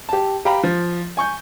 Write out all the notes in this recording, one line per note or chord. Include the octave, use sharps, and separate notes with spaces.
G4 A5
G4 F5 G5 A#5 B5
F3
G#5 C#6 G6